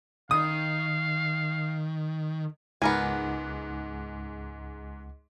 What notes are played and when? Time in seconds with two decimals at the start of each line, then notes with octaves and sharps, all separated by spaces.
0.31 D#3 F5 D#6
2.82 C#2 G#2 B3 A#4 F#5 G#5 D6